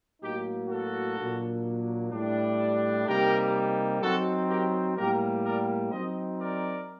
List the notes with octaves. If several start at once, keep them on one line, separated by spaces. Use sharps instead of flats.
A2 F#3 A#3 D#4 G4
F#4 A4
A#2 F#3 A#3 D4
A2 G3 D4
C3 G3 A#3 D#4 G4 A#4
F#3 C4 D#4 F#4 A4
G4 A#4
A2 G3 A#3 G4 A#4
A#4 D5
F#3 C4 D#4 C5 D#5
A#4 D5